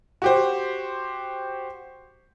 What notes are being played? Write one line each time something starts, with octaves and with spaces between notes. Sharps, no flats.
F#4 G4 C5